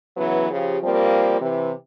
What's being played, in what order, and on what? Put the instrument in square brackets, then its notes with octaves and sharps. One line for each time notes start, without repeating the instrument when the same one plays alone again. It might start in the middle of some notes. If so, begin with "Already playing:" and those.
[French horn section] C#3 E3 F#3 B3
C#3 F3 G4
F3 G3 A#3 C4
C3 E3